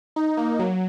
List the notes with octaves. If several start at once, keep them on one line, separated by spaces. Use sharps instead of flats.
D#4
A#3
F#3